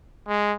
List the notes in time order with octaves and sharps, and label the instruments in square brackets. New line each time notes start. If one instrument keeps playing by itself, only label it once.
[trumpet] G#3